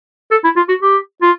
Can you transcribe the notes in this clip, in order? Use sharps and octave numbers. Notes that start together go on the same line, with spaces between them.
A4
E4
F4
F#4
G4
F4